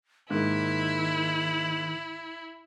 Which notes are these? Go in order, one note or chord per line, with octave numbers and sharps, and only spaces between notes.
G#2 D#3 A#3 E4